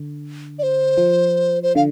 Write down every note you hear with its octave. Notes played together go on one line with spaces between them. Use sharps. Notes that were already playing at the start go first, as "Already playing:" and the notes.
Already playing: D3
D5
C5
F3
C5
D3 F5